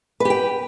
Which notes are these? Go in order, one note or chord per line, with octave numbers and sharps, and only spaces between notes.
G4 B4 G5